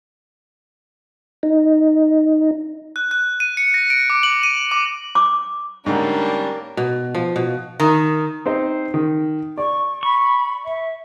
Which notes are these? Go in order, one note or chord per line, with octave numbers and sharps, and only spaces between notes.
D#4
F#6
F#6
D#7
C#7
A#6
D7
D6
F#7
D#7
D6
D6
G#2 D3 G3 A#3 C#4 D4
B2
F3
B2
D#3
C4 D#4 C5
D#3
D5 C#6
B5 C#6
E5